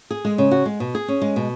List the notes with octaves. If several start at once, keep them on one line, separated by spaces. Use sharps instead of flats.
G#4
G#3
C#3
F#4
G#3
B2
G#4
C#4
G#3
B2